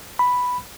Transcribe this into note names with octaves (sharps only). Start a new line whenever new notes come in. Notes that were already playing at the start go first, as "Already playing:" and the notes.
B5